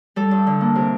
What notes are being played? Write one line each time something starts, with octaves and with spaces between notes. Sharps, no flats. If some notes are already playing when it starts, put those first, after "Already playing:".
G3 A4
G2
D3
A#3
C3